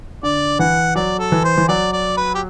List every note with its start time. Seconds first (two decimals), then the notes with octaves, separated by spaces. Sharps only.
0.23 D3 D5
0.59 E3 F#5
0.95 F#3 D5
1.19 A4
1.32 E3
1.44 C5
1.58 E3
1.68 F#3 D5
1.92 D5
2.17 B4
2.35 G4